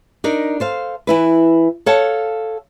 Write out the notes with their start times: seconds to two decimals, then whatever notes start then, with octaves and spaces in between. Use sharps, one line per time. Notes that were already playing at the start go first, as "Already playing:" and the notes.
0.24 D4 D#4 A#4
0.60 A4 C5 F5
1.07 E3 E4 B4
1.86 A4 C#5 F5 F#5 A5